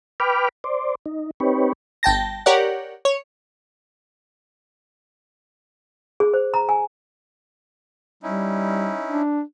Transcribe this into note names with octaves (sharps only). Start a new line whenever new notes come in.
B4 G5 B5 D6 F6
C5 D5
D#4
C4 D#4 G4 B4 C#5
G1 G5 A5 A#6
G4 A#4 C#5 D5 F#5
C#5
G#4
C5
A#5
G#5
G3 C#4 D#4 E4
D4